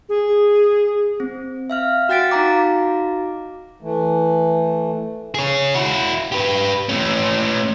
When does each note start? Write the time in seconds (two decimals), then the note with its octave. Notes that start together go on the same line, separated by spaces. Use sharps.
0.09 G#4
1.20 C4
1.70 E5 F5 F6
2.09 F#4 F#5 G5 A6 B6 D7
2.31 D#4 F#4 F5 A#5 D6
3.82 E3 A3
5.34 G#4 C#5
5.75 E4 F#4
6.32 G4 B4
6.89 A3 C#4